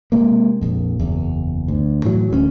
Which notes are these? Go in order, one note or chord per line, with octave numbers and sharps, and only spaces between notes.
C3 G#3 A#3
A#1 F2
F#1 E2
D2
A2 E3 F#3
D1 D2 G3 C#4